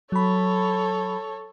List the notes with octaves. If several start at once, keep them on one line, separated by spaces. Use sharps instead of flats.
F#3 A4 C#5 B5